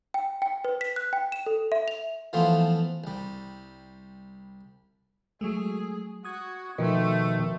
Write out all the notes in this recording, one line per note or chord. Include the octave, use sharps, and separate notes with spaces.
G5
G5
B4
B6
F#6
G5
E7
A4
E5
F7
E3 F3 A3 B3 C4 F4
C2 G3
F#3 G#3 A3 G#4
F#4 D#6 G#6
B2 D#3 F3 A3